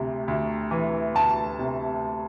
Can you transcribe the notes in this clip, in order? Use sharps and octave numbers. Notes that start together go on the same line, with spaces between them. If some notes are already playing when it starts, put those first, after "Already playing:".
Already playing: D2 C3
D2
E3
D2 A5
C3